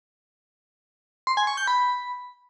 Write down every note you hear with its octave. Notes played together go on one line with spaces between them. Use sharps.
C6
G#5
C#6
G6
B5